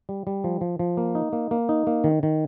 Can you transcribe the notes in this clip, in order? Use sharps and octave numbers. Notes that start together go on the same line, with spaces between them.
G3
G3
F3
F3
F3
A#3
D#4
A#3
A#3
D#4
A#3
D#3
D#3